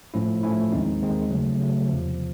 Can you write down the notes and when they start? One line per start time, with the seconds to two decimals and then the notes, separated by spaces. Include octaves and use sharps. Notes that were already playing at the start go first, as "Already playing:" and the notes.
0.14 A2 F3 A3 C#4 E4
0.43 A2 F3 A3 C#4 E4
0.72 D#2 D#3 G#3 C4 D#4
1.01 D#2 D#3 G#3 C4 D#4
1.30 C#3 F#3 A3
1.59 C#3 F#3 A3
1.89 E2 C3 F3